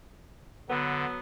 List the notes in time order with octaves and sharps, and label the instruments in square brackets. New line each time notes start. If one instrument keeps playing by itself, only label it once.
[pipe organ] D3 [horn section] F#3 B3